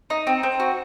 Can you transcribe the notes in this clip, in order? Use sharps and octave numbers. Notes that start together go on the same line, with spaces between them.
D#4
C4
C4
F#4